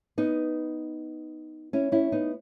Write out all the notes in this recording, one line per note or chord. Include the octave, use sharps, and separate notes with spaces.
B3 D#4
C#4 E4
C#4 E4
B3 D#4